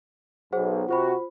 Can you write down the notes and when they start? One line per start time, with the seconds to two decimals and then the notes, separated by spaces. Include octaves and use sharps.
0.53 B1 G#4 C5 F#5
0.89 C3 F4 F#4 C5 B5